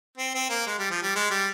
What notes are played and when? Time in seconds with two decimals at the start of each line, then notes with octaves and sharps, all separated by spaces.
0.18 C4
0.35 C4
0.50 A#3
0.66 G#3
0.79 G3
0.91 F3
1.03 G3
1.16 G#3
1.30 G3